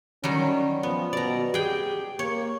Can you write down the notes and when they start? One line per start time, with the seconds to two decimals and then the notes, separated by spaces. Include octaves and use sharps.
0.24 D#3 F#3 G3 C#4
0.83 F3 B3
1.13 B2 D5 A#5
1.54 G4 G#4 G5
2.19 A#3 C#5